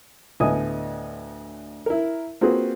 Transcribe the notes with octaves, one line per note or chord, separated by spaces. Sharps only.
D2 A2 B3 D#5 G#5 D#6
E4 A#4
A#3 C4 F4 F#4 G#4 B4